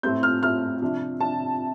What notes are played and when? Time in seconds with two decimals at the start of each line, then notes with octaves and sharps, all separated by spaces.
0.03 A2 A3 C4 G6
0.23 F6
0.42 A2 A3 C4 F6
0.82 C3 F3 D4
1.20 C3 F3 D4 A5